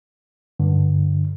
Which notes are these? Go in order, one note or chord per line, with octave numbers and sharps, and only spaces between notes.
G2 D3